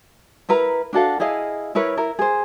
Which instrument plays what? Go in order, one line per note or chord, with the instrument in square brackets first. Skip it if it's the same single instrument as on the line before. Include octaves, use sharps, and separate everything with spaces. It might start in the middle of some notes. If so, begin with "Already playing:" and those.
[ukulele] E4 A#4 B4 A#5
D4 F#4 A4 F5
E4 G#4 D#5 F5
E4 A#4 B4 C#5
E4 A#4
G#4 C5